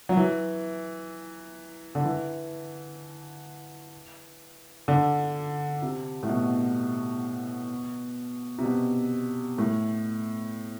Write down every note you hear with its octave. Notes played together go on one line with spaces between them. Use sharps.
F#3
E3
D3
E3
D3
C3
A2
B2
C3
B2
A2